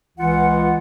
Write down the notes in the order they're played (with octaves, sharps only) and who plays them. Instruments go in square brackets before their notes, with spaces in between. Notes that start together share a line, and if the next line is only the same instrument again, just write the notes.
[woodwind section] C#2 E3 F4 F#5